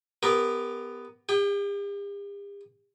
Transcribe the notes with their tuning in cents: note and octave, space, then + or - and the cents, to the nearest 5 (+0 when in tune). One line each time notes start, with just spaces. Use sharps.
B3 +10 G4 +25 A#4 +0
G4 +45 G5 +0